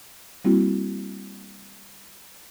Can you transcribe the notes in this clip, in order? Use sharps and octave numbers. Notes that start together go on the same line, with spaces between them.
G3 A#3 C4 E4 F#4